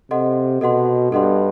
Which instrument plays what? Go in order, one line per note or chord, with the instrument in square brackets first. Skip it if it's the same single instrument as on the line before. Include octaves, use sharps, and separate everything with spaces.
[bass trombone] C3 [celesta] A4 D#5 F#5 C6
[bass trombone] B2 [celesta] A4 D#5 F#5 C6
[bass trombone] G2 [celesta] A4 D#5 F#5 C6